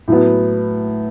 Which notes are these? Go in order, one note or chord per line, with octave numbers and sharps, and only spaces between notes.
A2 F#3 B3